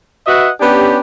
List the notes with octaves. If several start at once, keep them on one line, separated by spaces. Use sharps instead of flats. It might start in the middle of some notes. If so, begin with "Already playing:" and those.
F#4 B4 D#5 E5 F#5
B3 C#4 D4 G4